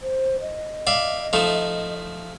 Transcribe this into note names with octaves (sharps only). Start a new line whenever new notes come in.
C5
D#5
D5 E5 F5
F3 A3 D#4